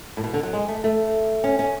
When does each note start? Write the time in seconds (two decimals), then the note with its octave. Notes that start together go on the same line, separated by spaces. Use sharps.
0.17 A2
0.24 B2
0.34 D3
0.43 F#3
0.53 G#3
0.68 A3
0.84 A3
1.44 C#4
1.59 C#4